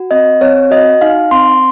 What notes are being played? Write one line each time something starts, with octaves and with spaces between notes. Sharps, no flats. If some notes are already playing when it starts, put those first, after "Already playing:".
Already playing: F#4
C4 D#5
C4 C#5
F#4 D#5
D#4 F5
C4 C6